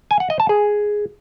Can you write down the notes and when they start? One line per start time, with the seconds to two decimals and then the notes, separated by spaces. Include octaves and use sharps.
0.11 G#5
0.20 F#5
0.30 D#5
0.40 A5
0.49 G#4